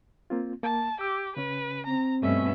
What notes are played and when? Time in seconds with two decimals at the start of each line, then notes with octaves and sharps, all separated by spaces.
0.30 A#3 C4 F4
0.63 A#3 A5
1.01 G4 E6
1.37 C#3 C#4 B4
1.86 C4 A#5
2.23 G2 B2 A3 C#4 E5